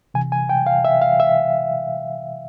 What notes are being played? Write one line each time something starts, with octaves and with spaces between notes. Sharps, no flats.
C3 E3 G#5
G#5
G5
F5
E5
F5
E5